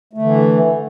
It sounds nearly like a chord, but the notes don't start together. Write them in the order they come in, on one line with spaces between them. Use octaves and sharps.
A3 D3 E3